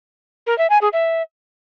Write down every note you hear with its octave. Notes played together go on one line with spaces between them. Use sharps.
A#4
E5
G#5
G#4
E5